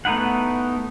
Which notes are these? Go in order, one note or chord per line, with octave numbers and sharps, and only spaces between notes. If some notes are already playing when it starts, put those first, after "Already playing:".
A3 B3 D#4 E4 F#5